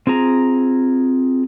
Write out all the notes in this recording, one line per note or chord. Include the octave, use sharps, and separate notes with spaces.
C4 F4 G#4 A#5